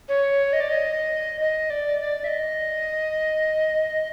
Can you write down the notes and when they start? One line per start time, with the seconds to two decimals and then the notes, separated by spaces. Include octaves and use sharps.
0.09 C#5
0.53 D#5
0.60 D5
0.69 D#5
1.41 D#5
1.70 D5
2.00 D5
2.24 E5
2.28 D#5